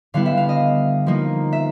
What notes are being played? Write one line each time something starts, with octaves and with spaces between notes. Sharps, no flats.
D3 G3 B3 E4 F5
E5
F5
D#5
F3 A#3 D#4
E5